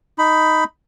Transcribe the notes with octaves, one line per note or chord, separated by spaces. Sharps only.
D#4 B5